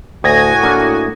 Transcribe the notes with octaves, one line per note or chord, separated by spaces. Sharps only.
D2 A2 F#4 G#5 D#6 G#6 A#6
A#3 D4 E4